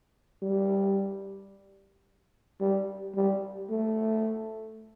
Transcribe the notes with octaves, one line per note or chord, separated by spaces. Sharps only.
G3
G3
G3
A3